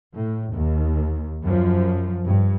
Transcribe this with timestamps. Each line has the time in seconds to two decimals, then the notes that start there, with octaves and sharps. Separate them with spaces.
0.15 A2
0.54 D#2
1.44 F#2 F3
2.24 G2